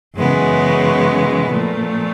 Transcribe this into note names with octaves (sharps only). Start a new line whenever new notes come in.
F#2 C#3 E3 G#3 B3
A#2 F3 A3